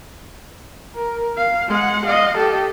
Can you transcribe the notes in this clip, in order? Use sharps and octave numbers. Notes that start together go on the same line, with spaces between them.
A#4
F5
G#3 F#5
D#5 F5
G4 A4